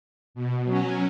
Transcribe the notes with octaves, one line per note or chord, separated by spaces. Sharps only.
B2
F#3 C#4